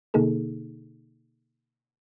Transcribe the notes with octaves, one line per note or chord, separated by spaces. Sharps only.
B2 D3 A#3 D#4 G#4 A4